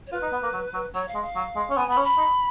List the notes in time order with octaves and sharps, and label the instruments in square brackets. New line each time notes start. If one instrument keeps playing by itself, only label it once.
[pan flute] C#5
[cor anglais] F4 [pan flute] B4
[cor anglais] D#4
B3
A#3
F#3
F#3
[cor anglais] F#3 [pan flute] C#5
[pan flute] F5
[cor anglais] G#3
[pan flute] F5
[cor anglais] F#3
G#3
C#4
[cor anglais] B3 [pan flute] G#5
[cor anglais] B3 [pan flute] B5
[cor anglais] C#4
[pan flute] B5
[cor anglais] D#4